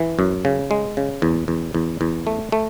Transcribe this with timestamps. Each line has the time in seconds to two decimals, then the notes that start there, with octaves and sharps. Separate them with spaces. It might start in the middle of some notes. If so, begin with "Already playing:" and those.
Already playing: E3
0.19 F#2
0.45 C#3
0.71 G#3
0.97 C#3
1.22 E2
1.48 E2
1.75 E2
2.01 E2
2.27 A3
2.52 A3